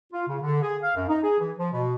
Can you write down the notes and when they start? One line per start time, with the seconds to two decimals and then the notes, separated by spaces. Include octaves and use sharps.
0.13 F4
0.28 C#3
0.42 D3
0.63 G#4
0.82 F5
0.95 F#2
1.08 D#4
1.23 G#4
1.40 E3
1.58 F3
1.73 B2